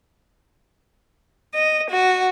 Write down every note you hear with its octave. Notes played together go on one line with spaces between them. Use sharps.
D#5
F#4